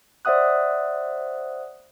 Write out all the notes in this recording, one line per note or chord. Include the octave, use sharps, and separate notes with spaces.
C5 D5 E5 F#5 D#6 F#6